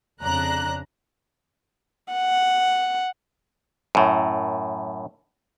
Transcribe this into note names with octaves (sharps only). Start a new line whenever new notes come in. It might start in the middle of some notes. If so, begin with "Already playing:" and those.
F2 C#3 D4 A#5 F#6
F#5
F#2 A2